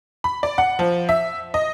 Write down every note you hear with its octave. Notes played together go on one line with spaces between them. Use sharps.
B5
D5
F#5
F3
E5
D#5